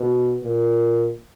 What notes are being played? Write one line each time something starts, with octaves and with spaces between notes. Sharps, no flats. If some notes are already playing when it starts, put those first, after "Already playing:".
Already playing: B2
A#2